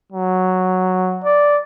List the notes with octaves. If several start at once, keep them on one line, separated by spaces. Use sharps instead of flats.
F#3
D5